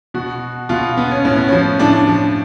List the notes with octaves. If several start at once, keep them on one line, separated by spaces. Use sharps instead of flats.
B2 F#4
B2 F4
B3
C#4
A2 C#4
B3
F3 C#4
A2 D4
F3